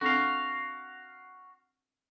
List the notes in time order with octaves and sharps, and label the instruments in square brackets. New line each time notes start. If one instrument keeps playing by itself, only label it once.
[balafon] C4 D4 A4 [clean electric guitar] F#4 F5